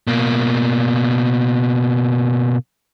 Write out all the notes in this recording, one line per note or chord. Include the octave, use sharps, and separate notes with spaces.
B2 A#3